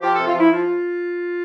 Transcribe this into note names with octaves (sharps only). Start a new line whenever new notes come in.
F3 G4
A4
C3
F4
F3 E4
F3 F4